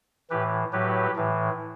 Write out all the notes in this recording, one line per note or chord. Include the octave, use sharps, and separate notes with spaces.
A2 E3 G4 B4
A2 F#3 G4 B4
A2 E3